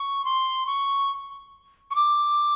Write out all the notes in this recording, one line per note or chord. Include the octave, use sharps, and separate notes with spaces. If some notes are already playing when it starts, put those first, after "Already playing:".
Already playing: C#6
C6
C#6
C#6
D6